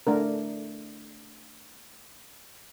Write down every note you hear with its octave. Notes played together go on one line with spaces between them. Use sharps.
A3 D4 A#4